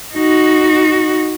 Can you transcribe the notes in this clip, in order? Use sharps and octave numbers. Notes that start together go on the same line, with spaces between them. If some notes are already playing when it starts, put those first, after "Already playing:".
D#4 F#4